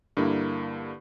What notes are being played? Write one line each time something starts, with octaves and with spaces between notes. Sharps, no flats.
G2 D3 A#3 E4